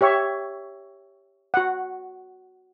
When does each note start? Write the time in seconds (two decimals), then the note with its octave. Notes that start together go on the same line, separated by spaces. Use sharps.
0.01 G4 C#5 E5 C#6
1.54 F#4 F#5